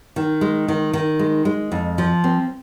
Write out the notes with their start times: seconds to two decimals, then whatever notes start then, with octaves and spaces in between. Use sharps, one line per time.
0.16 D#3
0.41 G#3
0.68 D#3
0.93 D#3
1.19 G#3
1.45 G#3
1.72 F2
1.98 F3
2.24 C4